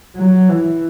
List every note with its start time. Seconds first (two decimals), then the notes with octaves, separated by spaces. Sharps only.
0.16 F#3
0.49 E3